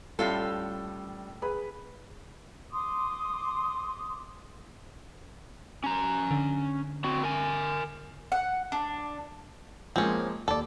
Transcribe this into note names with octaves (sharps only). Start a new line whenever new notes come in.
A2 G3 C#4 F4 A4
G#4 B4 B5
C6 D6 D#6
C#4 A#5
D3
C4 F#4
A#4 G#5
F#5
D4
F3 G#3 A#3 C4 C#4
D#2 A4 D5